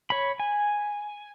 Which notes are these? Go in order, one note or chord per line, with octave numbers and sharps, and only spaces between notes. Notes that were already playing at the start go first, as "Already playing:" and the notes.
C#5 B5
G#5